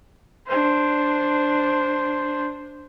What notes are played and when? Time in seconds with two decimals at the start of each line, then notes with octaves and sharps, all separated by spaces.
0.47 D4 C5